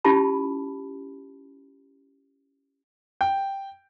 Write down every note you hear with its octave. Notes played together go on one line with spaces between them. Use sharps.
C#4 E4 F4 G4 A5 B5
G5